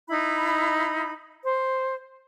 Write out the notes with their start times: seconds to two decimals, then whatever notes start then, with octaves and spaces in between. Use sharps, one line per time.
0.09 D#4 E4 B5
1.44 C5